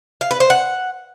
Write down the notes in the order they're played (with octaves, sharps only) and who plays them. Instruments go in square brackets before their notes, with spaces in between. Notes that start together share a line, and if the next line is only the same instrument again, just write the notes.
[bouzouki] F5
B4
C5
F#5